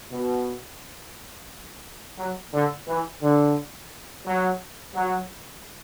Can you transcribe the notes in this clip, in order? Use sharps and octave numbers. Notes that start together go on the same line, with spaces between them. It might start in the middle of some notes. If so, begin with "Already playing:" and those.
B2
F#3
D3
E3
D3
F#3
F#3